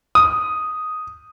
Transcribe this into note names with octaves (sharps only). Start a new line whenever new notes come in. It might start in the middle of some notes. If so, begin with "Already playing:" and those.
D#6